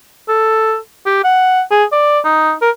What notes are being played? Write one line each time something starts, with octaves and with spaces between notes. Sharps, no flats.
A4
G4
F#5
G#4
D5
D#4
A#4